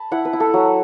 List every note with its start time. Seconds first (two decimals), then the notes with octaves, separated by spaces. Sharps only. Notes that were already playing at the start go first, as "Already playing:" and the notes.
Already playing: A5 B5
0.11 E4 F#5
0.25 B4
0.33 E4
0.40 A4
0.54 F#3